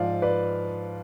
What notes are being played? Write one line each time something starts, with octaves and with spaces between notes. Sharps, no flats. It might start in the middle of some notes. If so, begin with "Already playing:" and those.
Already playing: G#2 F3 D5 F5
B4 D5